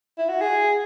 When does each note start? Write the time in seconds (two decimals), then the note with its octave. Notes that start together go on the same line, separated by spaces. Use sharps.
0.18 E4
0.29 F#4
0.42 G#4